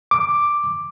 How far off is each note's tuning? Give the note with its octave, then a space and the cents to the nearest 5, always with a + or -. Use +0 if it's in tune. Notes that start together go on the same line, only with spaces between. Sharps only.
D6 +5